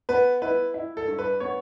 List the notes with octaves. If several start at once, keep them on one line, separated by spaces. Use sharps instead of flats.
B3 B4
E4 B4
E4
A4
G2
B4
B3 C#5